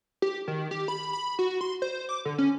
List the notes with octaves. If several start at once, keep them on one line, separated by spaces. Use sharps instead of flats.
G4
D#3
G4
B5
B5
F#4
C6
C5
D6
D3
C#4